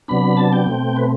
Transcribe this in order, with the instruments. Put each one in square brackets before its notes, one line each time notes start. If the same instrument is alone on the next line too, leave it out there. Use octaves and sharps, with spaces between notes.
[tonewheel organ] C3 F#3 B3 D4 B5
A5
G5
B2 A3 C4
B4